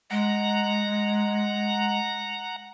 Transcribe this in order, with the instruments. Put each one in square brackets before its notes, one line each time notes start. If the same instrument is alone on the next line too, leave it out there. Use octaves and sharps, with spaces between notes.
[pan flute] G#3 [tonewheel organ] F#5 A#5